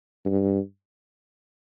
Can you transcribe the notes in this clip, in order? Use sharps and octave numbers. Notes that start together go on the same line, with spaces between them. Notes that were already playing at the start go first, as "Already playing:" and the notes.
G2